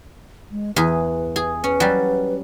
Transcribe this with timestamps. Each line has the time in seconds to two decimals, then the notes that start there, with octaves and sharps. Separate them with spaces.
0.51 G#3
0.76 E2 G#4 B4
1.36 G#4
1.64 C#4 B4
1.80 F#3 G3